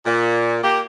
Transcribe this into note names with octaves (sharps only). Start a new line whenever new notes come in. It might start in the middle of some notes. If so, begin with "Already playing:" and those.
A#2
A#3 G4